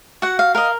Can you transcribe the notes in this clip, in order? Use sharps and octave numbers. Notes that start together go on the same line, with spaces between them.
F#4 F#5
F5
A#4 D#5 F5